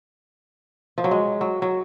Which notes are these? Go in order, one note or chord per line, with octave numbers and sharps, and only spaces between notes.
F3
F#3
G#3
F#3
F#3